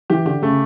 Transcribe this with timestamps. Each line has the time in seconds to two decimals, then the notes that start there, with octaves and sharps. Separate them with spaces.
0.10 E3 G4
0.25 D3 G4
0.42 C#3 A3